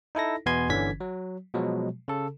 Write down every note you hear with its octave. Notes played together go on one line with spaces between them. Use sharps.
D#4 E4 A4 A#6
E2 B2 B3 G#5 C6 G#6
G1 D3 E3 C#4 G#6 B6
F#3
B2 F3 F#3 G#3
C#3 A4